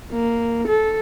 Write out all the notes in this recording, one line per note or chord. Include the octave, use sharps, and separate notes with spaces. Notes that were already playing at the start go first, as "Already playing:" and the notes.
A#3
A4